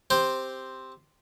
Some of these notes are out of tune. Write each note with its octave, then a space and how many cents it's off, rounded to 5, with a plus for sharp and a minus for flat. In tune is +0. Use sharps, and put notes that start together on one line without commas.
C4 +0 G4 +0 C5 +0